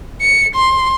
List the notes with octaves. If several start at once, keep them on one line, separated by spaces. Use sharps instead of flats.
C#7
C6